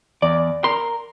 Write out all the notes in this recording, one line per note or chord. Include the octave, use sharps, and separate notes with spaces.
E2 D5
A#4 C6